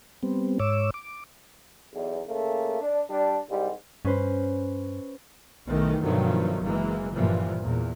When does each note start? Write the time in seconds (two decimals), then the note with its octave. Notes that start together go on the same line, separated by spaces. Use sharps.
0.23 G3 B3 C4
0.60 G#2 C#5 D6 E6
0.94 D6
1.93 B1 E2
2.26 C#3 A3 A#3
2.81 D4
3.09 G3 D4
3.48 C2 G#2 G3
4.05 G2 C#4 B4 C5
5.68 B1 D#3 E3 A3 B3
6.02 G2 B2 D#3 F3 F#3 A3
6.63 F#1 E3 G#3 A#3
7.14 G2 A#2 E3 F3
7.62 E2 A#2